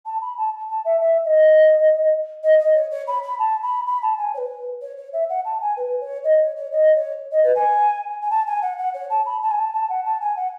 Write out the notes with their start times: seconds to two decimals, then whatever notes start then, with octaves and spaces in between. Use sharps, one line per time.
0.05 A5
0.21 B5
0.37 A5
0.68 A5
0.84 E5
1.00 E5
1.24 D#5
2.43 D#5
2.59 D#5
2.74 C#5
2.90 C#5
3.07 B5
3.23 B5
3.38 A5
3.62 B5
3.86 B5
4.02 A5
4.18 G#5
4.34 C#5
4.37 B4
4.81 C#5
4.97 C#5
5.12 E5
5.29 F#5
5.44 A5
5.60 G#5
5.76 B4
6.00 C#5
6.24 D#5
6.40 C#5
6.56 C#5
6.71 D#5
6.95 C#5
7.31 D#5
7.43 B4
7.55 G#5
8.22 G#5
8.30 A5
8.46 G#5
8.62 F#5
8.78 F#5
8.94 C#5
9.10 A5
9.25 B5
9.41 A5
9.50 G#5
9.58 A5
9.73 A5
9.89 F#5
10.05 A5
10.20 G#5
10.36 F#5